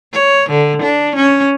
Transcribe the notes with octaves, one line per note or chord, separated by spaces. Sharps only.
C#5
D3
D4
C#4